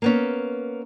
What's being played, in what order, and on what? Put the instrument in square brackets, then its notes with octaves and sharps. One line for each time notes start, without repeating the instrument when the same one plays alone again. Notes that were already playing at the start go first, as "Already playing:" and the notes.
[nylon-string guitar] A#3 B3 C#4